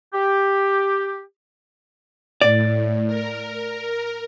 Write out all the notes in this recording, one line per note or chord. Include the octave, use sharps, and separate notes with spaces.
G4
A2 D5
A#4